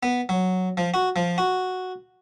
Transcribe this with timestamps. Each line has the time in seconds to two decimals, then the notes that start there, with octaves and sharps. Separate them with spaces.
0.03 B3
0.29 F#3
0.77 F3
0.94 F#4
1.16 F3
1.38 F#4